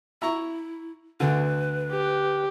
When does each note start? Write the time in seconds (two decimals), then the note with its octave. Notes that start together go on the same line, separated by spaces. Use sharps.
0.22 E4 E5 A#5 C#6
1.20 D2 D3 B4
1.92 G4